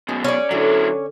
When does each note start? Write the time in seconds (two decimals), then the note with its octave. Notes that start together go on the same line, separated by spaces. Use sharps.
0.09 F#2 B2 G#4
0.24 C#4 D5
0.51 D3 F#3 E4 A4